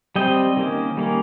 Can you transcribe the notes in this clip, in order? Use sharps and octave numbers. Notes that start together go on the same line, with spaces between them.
G3 C4 D#5 G5
D#3 A#3 C#4
G3 A#3 C#4